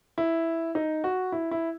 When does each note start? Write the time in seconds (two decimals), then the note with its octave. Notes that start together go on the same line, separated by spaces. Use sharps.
0.18 E4
0.75 D#4
1.04 F#4
1.32 E4
1.51 E4